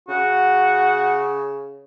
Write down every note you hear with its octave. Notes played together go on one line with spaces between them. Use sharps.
C#3 F#4